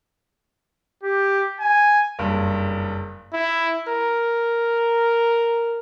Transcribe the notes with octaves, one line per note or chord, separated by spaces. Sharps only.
G4
G#5
F#1 G2
E4
A#4